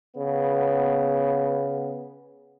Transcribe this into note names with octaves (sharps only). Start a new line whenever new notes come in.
C#3 B3